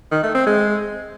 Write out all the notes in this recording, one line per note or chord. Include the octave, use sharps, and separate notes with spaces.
D#3
A3
C4
G#3